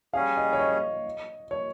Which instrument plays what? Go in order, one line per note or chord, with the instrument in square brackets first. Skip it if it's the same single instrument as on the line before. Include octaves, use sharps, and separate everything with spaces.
[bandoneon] G3 C#4 G#4 [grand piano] F5
[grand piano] D#5
C#5
D#5
C#5